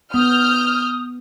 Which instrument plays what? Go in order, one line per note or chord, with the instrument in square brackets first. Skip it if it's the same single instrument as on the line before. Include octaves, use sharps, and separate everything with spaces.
[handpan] B3 [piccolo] D#6 [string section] F6 G6